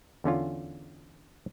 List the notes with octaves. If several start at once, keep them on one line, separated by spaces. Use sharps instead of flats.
E2 D3 C#4 F4